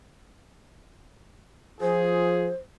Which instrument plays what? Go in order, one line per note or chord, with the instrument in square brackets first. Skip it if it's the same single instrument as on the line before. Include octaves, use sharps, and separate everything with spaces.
[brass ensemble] F3 F4 G#4 [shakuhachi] C5